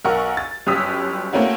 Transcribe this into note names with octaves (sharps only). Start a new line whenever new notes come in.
B1 A#4 F#5 C#6
A6
G1 F#2 G4 D#6 E6 B6
A3 A#3 C4 C#4 E4 F#4